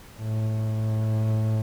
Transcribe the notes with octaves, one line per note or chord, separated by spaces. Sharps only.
A2